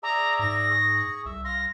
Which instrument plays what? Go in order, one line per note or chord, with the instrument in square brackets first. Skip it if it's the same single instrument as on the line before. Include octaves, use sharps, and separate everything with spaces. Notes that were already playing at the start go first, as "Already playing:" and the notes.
[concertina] G#4 D5 E5 [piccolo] A#5
[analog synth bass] G#2 [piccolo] A#6
[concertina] G#4 C#6
[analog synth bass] C2 [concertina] E5
[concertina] F5 C6 [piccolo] A#6